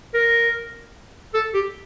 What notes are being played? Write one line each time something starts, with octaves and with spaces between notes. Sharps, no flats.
A#4
A4
G4